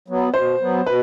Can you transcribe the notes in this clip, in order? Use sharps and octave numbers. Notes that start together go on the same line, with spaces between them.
F#3 B3
B2 C5
F#3 B3
B2 B4